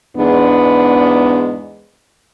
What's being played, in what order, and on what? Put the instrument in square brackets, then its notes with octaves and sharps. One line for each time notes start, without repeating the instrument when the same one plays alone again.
[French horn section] E2 G#2 G#3 B3 D4